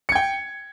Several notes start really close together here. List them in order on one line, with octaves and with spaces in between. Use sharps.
C#7 G#6 G5